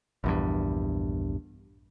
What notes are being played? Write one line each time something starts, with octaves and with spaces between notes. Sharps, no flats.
A#1 E2 G2